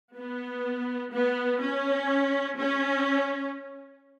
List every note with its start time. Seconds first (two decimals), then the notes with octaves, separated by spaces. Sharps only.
0.17 B3
1.14 B3
1.62 C#4
2.59 C#4